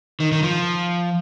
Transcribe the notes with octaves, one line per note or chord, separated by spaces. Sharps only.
D#3
D#3
F3